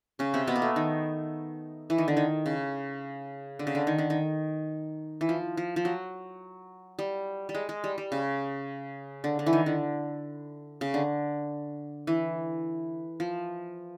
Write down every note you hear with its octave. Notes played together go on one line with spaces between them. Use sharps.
C#3 C#4
C3 C4
B2 B3
A#3
A3
D#3
E3
D#3
D3
D#3
C#3
D3
C#3
D3
D#3
D3
D#3
E3
F3
F3
F3
F#3
G3
G3
G#3
G#3
G3
G3
C#3
D3
D3
E3
D#3
D3
C#3
D3
E3
F3